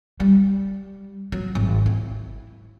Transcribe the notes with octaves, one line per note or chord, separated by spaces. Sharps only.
G3
F#3
G#1
E4